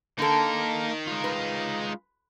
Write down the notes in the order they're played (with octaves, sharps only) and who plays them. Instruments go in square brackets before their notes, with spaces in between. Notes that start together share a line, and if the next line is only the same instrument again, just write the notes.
[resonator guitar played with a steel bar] D3 A4 [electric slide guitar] A#3 [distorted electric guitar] D#4 A#4
[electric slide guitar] G#3 F4
[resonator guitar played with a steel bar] B4